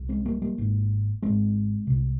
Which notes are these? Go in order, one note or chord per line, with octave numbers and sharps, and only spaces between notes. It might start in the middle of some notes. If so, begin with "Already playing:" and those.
Already playing: C2
G#3 C4
G3 A#3
G3 A#3
G#1 G#2
G#1 G#2 G#3 C4
C2 C3